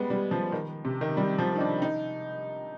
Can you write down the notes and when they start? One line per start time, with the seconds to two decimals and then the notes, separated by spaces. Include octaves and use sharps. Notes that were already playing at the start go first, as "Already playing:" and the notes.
Already playing: G3 G#3 B3
0.10 G3
0.31 F3
0.52 D#3
0.85 C3
1.01 D#3
1.17 G3
1.38 F3
1.56 D#4
1.60 D4
1.82 D#4